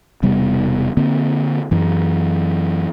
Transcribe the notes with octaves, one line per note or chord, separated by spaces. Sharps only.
E1 C3 G3 B3
D3 A#3 C4
F#2 E3